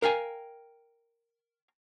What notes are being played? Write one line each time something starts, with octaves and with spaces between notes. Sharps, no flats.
A#4 F5 G5 G#5